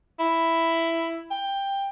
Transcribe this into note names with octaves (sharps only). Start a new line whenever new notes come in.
E4
G5